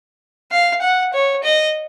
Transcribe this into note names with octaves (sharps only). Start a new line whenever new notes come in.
F5
F#5
C#5
D#5